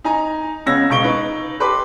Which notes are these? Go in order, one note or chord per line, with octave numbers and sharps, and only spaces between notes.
D#4 G#5 A#5
C#2 B3 C#4 E6 G#6 A#6
E1 C#2 C#6 D7 G7
D#4 B4
G4 A4 B4 B5 C6 D6